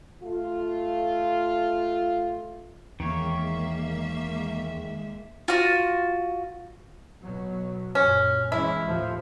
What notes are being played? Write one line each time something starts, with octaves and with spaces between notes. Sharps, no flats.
A3 F4
E2 D#3 G#3 A#3 C#5 E5
F4 F#4
B2 F#3
F#2 A#2 C#4
E3 G#3 C#4 E4
D#2 A2 F3